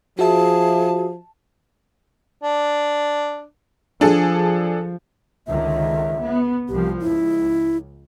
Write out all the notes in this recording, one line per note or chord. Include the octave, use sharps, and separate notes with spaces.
F3 F#4 G#4 E5 A5
D4
F3 D4 G#4 A4
C#2 D3 D#3 E5
B3
C2 F3 G4
C#2 E4